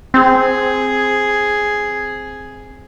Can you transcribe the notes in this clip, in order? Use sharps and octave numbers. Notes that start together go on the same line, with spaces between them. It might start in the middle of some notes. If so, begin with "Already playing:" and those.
C4 G#4